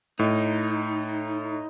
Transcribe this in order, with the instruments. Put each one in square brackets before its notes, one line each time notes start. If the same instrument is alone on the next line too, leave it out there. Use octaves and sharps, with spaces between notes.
[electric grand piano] A2 [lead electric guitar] D#4